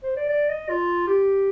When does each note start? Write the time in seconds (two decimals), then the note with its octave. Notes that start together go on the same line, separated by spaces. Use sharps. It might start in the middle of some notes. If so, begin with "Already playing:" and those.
0.03 C5
0.16 D5
0.29 D5
0.49 D#5
0.69 F4
1.07 G4